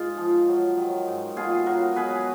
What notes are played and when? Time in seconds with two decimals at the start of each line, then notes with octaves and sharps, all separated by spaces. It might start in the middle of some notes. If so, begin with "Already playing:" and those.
Already playing: G#2 F4 G#4
0.17 F3
0.48 F#3
0.77 D#3
1.08 G#2
1.36 B2 F4 G#4
1.66 F#3 F#4 A#4
1.96 B2 G#4 B4